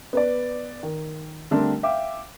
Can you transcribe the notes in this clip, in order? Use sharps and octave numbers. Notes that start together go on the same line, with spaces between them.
B3 B4 D5
D#3
D3 G3 A3 C4 D4 A#4
E5 F5 G5 D6